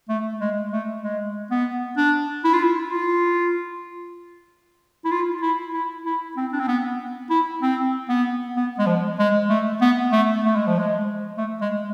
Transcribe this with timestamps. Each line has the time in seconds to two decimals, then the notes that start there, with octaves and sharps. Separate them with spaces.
0.09 A3
0.41 G#3
0.72 A3
1.03 G#3
1.51 B3
1.97 D4
2.45 E4
2.53 F4
2.63 E4
2.91 F4
5.05 E4
5.12 F4
5.42 E4
5.74 E4
6.06 E4
6.37 C4
6.53 D4
6.60 C4
6.68 B3
7.30 E4
7.62 C4
8.09 B3
8.56 B3
8.79 G#3
8.87 F3
9.19 G#3
9.50 A3
9.81 B3
10.12 A3
10.44 A3
10.56 G#3
10.67 F3
10.79 G#3
11.38 A3
11.61 G#3